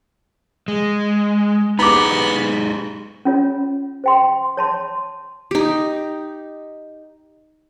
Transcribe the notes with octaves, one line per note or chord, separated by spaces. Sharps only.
G#3
B3 D#4 G4 G#4 A#5 D6
C#4 F4 C#5
C5 G5 C6
C#5 A5 C6
D#4 G4